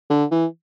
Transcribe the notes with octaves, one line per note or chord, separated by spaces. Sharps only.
D3
E3